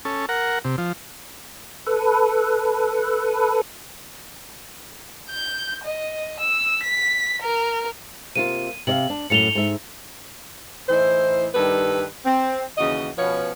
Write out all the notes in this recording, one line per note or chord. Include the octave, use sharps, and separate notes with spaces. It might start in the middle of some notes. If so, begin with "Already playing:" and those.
C#4 A4
A#4 F#5
C3
F3
A4 B4
G6
D#5
E6
B6
A#4
C3 A#3 F4 D#7
C3 D5 F5 F#7
D4
F#2 A2 A3 C#7 F7 G7
G#2 E5
A2 E3 D#4 E4 C5
G2 D#3 G3 A4 B4
C4
D#2 C#3 E3 F#4 D#5
B2 F3 B3 C#4 B4 C#5